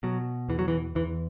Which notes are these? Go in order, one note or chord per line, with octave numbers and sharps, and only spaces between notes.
B2 F#3
E2 E3
F#3
E3
E2 E3